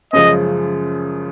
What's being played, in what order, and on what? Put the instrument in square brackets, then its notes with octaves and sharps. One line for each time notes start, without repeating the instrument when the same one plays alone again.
[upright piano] F#2 C#3 F3 G#3 [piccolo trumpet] D#5